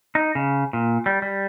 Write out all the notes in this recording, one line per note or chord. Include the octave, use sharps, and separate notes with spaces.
D#4
C#3
A#2
G3
G3